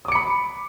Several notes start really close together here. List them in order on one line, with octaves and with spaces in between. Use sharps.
D#6 D6 C#7 B5